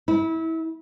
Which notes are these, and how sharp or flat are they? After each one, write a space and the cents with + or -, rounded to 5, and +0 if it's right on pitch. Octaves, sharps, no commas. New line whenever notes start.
E4 -25